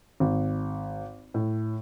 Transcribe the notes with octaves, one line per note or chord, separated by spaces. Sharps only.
G#1
A2